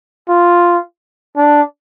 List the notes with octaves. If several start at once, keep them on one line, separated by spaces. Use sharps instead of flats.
F4
D4